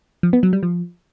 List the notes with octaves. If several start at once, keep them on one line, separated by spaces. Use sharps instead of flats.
F3
B3
F#3
G3
F3